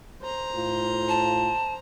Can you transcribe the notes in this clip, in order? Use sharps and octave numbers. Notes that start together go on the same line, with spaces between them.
C5 A#5
A2 F4
A5